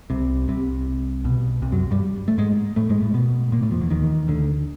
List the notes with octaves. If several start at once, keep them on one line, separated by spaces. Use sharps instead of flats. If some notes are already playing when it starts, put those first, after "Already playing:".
C2 C3
C2 C3
B1 B2
C2 C3
F#2 F#3
G2 G3
A3
G#2 G#3
A2 A3
G#2 G#3
A2 A3
B2 B3
A#2 A#3
A2 A3
F2 F3
E2 E3
D#2 D#3
D2 D3